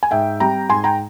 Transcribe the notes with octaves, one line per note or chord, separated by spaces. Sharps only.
G#5
G#2 E5 G5
G3 C4 G5 A#5
G#2 G#5 C6
G5 A#5